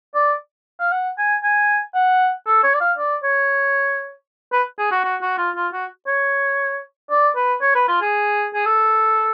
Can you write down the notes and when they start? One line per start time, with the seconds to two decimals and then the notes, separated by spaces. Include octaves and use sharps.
0.15 D5
0.80 F5
0.92 F#5
1.18 G#5
1.43 G#5
1.95 F#5
2.47 A4
2.64 C#5
2.74 D5
2.80 F5
2.98 D5
3.23 C#5
4.53 B4
4.79 G#4
4.91 F#4
5.04 F#4
5.22 F#4
5.38 F4
5.56 F4
5.73 F#4
6.07 C#5
7.10 D5
7.36 B4
7.62 C#5
7.75 B4
7.88 F4
8.01 G#4
8.54 G#4
8.65 A4